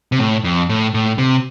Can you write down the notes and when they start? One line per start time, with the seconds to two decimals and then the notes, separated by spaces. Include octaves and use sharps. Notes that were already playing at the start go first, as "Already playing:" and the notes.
0.12 C3
0.19 A2
0.44 F2
0.69 A2
0.94 A2
1.18 C3